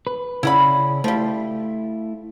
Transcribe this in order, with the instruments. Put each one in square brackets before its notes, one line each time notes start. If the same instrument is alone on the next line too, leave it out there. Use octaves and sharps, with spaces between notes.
[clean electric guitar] B4
[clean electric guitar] C#3 C#4 D5 [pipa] E4 F#5 B5
[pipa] F3 G3 [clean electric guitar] A3 E4